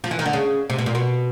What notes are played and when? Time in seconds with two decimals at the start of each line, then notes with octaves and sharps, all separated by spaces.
0.04 F3
0.11 E3
0.19 D#3
0.25 D3
0.33 C#3
0.70 C3
0.78 B2
0.86 A#2
0.95 B2